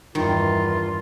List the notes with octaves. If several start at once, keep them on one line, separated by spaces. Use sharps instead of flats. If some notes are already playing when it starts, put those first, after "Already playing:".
E2 G2 D#3 F4